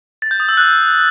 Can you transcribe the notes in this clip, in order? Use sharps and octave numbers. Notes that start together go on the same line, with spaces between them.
A6
G6
D#6
E6
F#6